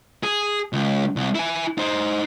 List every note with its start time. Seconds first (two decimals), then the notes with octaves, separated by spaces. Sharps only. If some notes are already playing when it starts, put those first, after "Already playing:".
0.23 G#4
0.73 C#2
1.16 C2
1.35 E4 G#5
1.78 D#4 C5